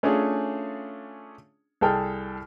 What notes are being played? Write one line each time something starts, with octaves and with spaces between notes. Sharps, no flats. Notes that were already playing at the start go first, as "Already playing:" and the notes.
A3 C#4 D4 F4 G#4
C2 G#4 A4 G5 A5 F6